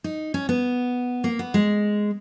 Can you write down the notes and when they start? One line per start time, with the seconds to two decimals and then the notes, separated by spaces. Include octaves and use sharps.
0.04 D#4
0.34 C#4
0.49 B3
1.24 A#3
1.39 B3
1.54 G#3